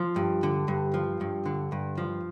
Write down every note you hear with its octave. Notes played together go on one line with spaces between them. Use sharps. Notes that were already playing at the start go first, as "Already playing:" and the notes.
Already playing: F3
G2
D3
G2
F3
G2
D3
G2
F3